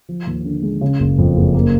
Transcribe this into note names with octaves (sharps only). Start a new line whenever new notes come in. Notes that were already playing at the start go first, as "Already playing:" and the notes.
F3
D#2
D3
G#3
C#3
F#1
F2
F#1
A#3